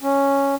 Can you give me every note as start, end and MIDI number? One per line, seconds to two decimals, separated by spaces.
0.02 0.55 61